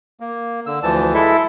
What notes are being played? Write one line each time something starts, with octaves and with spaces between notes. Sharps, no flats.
A#3
D3 E6
D2 E3 F3 A5
G#3 E4 A4 E5